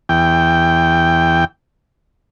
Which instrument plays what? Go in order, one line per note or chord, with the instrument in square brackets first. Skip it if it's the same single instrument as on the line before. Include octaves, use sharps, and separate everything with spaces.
[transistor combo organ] E2 G5